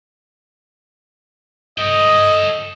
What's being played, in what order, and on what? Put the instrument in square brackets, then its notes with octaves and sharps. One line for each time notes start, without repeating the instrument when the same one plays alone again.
[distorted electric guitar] A4 G5 [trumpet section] D#5